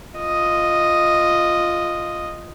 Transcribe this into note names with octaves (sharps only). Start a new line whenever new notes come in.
F4 D#5